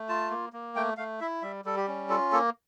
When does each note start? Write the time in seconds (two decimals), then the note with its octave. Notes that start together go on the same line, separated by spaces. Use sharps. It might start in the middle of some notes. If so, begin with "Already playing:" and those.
Already playing: A3
0.09 F4 A5
0.30 A#3
0.53 A#3
0.76 A3 G5
0.97 A3 F5
1.20 E4 E5
1.42 G3 E5
1.65 G3 A4
1.77 G4
1.88 C#4
2.09 F4 A4
2.32 A#3 A4